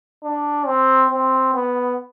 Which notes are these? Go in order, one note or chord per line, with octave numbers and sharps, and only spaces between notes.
D4
C4
C4
B3